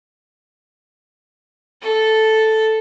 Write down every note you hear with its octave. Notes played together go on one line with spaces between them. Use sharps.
A4